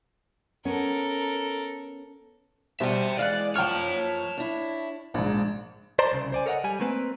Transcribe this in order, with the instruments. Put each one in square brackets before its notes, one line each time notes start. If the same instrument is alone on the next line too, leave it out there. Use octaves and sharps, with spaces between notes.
[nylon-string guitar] B3 C#4 [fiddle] A4 A#4
[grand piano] B2 G3 [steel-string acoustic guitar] C5 [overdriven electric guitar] E5 G5
[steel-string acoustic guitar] E3 G#3 [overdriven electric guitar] D5 [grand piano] F5 F#6
[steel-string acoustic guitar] F#2 F3 [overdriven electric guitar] C#5 A5 [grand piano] G5 C#6 F6
[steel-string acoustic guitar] D4 E4
[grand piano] A#1 G#2 [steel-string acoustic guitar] D4
[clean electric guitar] C5 D5 A5 A#5 C6
C2 C#3
C5 D5 G#5
A4 A#4 C#5 D#5 F5 F#5
G3 G#5
A3 A#3 C4 B4